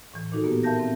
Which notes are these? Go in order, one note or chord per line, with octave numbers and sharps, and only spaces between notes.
A2 E3
A#2 D#3 D#4 F#4 A4
A#3 B3 G4
A#4 E5 F5 A5 G6 A#6
C4